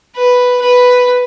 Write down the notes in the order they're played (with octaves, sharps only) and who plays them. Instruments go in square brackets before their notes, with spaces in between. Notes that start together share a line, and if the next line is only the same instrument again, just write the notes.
[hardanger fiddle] B4
B4